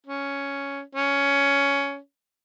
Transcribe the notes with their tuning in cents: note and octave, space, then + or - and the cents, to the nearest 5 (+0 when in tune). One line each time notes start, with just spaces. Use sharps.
C#4 +5
C#4 +15